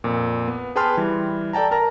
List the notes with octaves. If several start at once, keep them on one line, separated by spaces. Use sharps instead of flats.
F2 A#2
B3
G#4 B4 G5 A5 C6 F6
E3 G3
A4 D5 G5 A5 A#5
A#4 A5 A#5 A#6